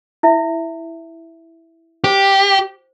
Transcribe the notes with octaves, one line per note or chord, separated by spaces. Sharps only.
E4 E5
G4 C5